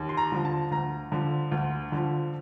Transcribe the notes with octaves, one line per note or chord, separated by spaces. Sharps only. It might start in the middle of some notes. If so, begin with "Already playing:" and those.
Already playing: D#2
C6
A#5
D3 F3
A5
D2 A#5
D3 F3
D2
D3 F3